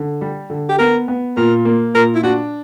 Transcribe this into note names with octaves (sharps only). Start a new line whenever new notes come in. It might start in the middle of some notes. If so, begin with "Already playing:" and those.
Already playing: D3
G3
D3
G4
B3 A#4
B3
A#2 A#4
A#3
A#2 A#4
E4
D4 F#4